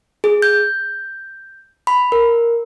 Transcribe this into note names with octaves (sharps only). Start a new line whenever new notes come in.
G#4
G6
B5
A#4